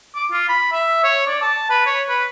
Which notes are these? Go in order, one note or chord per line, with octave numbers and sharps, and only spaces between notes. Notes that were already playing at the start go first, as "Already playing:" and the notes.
D6
F4
B5
E5
C#5
D5
A5
B4
C#5
B4